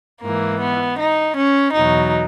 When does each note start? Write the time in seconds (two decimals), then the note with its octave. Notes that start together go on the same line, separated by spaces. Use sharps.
0.22 G#2 E3 A#3
0.60 B3
0.99 D#4
1.37 C#4
1.74 E2 B2 F#3 D#4